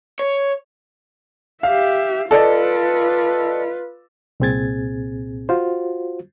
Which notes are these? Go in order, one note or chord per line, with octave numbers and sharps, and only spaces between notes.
C#5
G4 E5 F5
F4 A4 B4 D5 D#5
C2 A#2 C4 G#4 G#6 A6
F4 F#4 C5